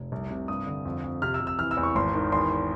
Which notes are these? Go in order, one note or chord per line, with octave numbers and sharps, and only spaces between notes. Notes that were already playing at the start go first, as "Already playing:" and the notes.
Already playing: F1
C2
C3
G2 D#6
D3
F2
F2
C3 F6
E6
C3
E6
E3 F6
E6
E2
C#6
G#1 C6
D#3
E2 C6